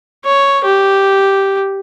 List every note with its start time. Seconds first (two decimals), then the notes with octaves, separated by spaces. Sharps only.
0.25 C#5
0.64 G4